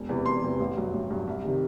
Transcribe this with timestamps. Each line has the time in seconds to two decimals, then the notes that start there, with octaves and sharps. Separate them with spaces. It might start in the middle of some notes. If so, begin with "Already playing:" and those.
Already playing: E1
0.09 E2 C3 E3
0.26 E1 C6
0.43 E2 C3 E3
0.60 A1
0.77 G2 F#3
0.93 A1
1.10 G2 F#3
1.27 C2
1.44 C3 D#3 G3